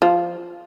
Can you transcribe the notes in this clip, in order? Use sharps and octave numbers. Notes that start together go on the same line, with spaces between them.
F3